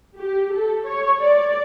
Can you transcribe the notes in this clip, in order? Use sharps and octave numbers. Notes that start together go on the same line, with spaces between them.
G4
A4
C#5
D5